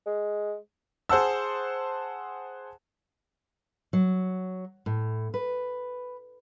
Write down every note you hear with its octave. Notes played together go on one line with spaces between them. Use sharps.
G#3
G#4 C5 F#5 A5 E6
F#3
A2
B4